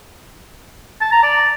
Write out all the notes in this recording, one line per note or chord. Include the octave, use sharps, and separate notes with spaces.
A5
A#5
D5